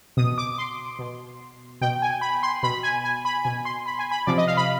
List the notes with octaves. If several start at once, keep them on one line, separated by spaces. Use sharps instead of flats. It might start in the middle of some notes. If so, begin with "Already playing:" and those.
B2 D#6
D6
C6
B2
B2 G5
G#5
B5
C6
B2 B5
G#5
G#5
B5
B2 G#5
C6
B5
G#5
B5
C3 F3 D5
D#5
F5
B5